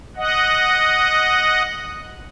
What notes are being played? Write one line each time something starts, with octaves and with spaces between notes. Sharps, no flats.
D#5 F#5